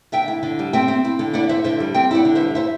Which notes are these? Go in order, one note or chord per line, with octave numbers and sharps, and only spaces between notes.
D3 E5 G5
E4
D3
G3
C4 E5 G5
C4
E4
D3
E4 D5 F#5
E4 C5 E5
D3 C5 E5
G3
C4 E5 G5
E4 D5 F#5
D3
C5 E5
G3
E4 C5 E5